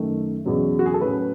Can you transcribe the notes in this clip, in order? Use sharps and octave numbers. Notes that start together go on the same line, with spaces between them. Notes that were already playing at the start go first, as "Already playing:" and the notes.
Already playing: F#2 D#3 A3
E2 B2 F#3 C#4
F#4
G#4
A4
A2 F#3 C#4 B4